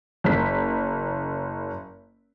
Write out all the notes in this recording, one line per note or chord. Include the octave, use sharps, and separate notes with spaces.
F#1 B6